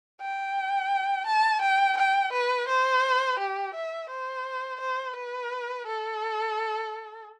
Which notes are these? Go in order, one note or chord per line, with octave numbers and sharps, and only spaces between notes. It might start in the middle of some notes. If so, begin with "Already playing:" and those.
G5
A5
G5
G5
B4
C5
G4
E5
C5
C5
B4
A4